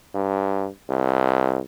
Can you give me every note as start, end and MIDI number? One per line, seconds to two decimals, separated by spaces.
0.14 0.68 43
0.89 1.59 36